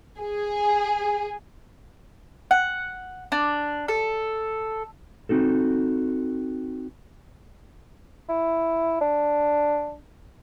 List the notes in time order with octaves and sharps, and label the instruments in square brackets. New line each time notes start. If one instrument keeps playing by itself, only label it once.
[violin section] G#4
[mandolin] F#5
D4
A4
[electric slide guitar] C4 D#4 F#4 A4
[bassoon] E4
D4